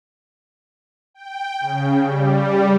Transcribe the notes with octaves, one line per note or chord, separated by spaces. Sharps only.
G5
C#3
G3